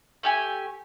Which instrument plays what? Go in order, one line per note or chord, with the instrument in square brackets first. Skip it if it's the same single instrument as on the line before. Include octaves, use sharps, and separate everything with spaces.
[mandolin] A3 G4 G#5